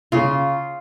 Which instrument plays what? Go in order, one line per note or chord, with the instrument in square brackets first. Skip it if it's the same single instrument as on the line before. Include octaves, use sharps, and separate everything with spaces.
[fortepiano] C#3 [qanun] F4